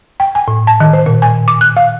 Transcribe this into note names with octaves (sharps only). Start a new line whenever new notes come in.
G5
G#5
A2
A5
D#3
C5
A#2
G#5
D6
F#6
F5